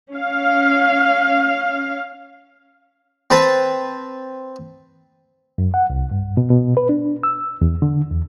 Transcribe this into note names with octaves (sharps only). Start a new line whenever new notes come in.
C#4 F5
C4 B4 A5
F#2
F#5
C2
G2
B2
B2
B4
D4
E6
E2
D3
E2